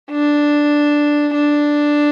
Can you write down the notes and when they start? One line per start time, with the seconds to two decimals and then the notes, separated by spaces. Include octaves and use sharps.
0.12 D4
1.34 D4